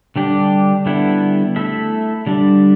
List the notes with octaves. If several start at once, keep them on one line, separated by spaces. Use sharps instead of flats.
D3 G3 D4 G4
D3 G3 B3 E4 A4
A3 E4 A4 E5
D3 G3 D4